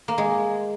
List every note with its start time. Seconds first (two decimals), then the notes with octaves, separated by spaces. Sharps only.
0.08 A#3
0.18 G#3